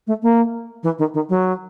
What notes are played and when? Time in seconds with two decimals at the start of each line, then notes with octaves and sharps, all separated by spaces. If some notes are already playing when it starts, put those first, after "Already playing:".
0.07 A3
0.22 A#3
0.83 E3
0.98 D#3
1.14 D#3
1.29 F#3